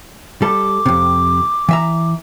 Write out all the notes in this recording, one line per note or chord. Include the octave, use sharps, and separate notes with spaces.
G3 A4 D6
F2 C3
E3 E5 A#5